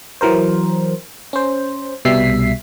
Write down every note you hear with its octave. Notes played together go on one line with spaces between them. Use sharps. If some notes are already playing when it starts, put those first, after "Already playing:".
E3 F#3 A#4 C5
C#4 C5
C2 B2 G3 E5 B6 C7